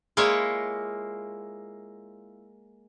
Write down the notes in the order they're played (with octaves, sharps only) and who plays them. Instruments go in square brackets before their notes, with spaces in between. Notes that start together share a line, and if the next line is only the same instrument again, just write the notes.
[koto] G#3 A#3 E4 F4 C#5